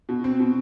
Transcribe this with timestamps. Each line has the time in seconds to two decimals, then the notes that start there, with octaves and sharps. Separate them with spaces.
0.09 B2
0.24 C4
0.40 B2